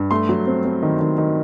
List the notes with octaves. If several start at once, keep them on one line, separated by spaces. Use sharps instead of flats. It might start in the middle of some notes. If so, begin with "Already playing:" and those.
Already playing: G2
A3 C6
F#3
C4
C4
D#3
D#3
D#3